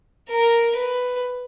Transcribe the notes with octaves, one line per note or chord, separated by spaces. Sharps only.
A#4
B4